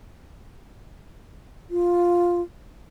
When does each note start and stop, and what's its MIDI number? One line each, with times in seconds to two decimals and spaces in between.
1.70 2.41 65